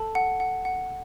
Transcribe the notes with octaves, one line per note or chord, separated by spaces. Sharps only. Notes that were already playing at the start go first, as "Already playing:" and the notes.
Already playing: A4 A5
F#5
F#5
F#5